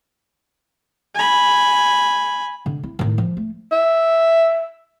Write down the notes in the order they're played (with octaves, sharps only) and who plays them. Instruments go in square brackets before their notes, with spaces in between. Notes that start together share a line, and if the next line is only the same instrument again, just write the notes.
[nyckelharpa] G#5 B5
[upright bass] D3
E4
A2 D#3
F3
A3
[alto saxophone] E5